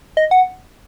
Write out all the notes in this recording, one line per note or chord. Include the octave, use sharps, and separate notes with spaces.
D#5
F#5